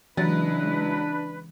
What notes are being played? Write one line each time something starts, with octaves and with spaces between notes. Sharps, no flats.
C#3 E3 F#3 G#3 D4 E4 B4 A6